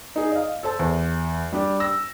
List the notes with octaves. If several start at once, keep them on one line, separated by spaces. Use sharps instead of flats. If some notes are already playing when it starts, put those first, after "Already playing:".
D#4 G#4
D#5 F5
A4 C5 A5
E2
G3 D4 G4
E6 A#6